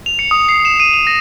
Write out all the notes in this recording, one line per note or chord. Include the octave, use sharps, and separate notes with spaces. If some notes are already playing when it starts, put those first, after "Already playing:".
F7
C#7
D#6
C7
E7
D#7
F7
A#6